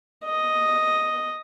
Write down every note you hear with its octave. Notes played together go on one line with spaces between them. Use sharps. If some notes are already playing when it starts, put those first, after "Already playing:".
D#5